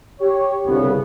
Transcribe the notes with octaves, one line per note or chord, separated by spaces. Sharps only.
G4 C#5
G1 C2 C#3 B3